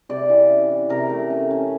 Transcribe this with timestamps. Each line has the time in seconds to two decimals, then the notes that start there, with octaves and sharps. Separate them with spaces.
0.09 C3 D5
0.29 E3
0.49 C#4
0.69 E3
0.89 C3 A#4
1.10 A3
1.30 C#4
1.50 C#4